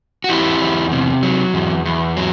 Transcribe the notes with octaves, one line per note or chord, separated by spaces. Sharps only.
F#4
E2 E4 G4
E2
C3
F#3
E2
E2
F#3